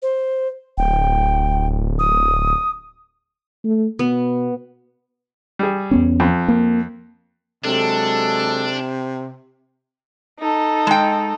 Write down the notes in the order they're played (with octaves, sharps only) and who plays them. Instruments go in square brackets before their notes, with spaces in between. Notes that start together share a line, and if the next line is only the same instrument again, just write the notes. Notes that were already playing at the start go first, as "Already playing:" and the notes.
[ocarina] C5
[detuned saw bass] D1 [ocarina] G5
[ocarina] D#6
[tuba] A3
[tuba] B2 [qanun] B3
[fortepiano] G3 G#4
[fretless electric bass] E2 B3 C#4
[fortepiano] F2
[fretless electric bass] A#3
[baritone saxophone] C3 [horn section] F#3 G#3 A4 [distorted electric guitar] D4
[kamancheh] D#4 A4
[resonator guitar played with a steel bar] G#3 G5